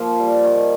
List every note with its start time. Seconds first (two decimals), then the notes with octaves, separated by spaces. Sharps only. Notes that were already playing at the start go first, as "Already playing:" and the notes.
Already playing: F3 A#3
0.19 G3
0.44 D#3